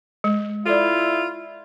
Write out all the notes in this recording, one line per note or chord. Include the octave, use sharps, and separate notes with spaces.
G#3
E4 F4 A4 D5